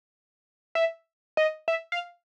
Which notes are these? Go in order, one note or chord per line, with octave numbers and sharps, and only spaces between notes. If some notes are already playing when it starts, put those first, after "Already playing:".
E5
D#5
E5
F5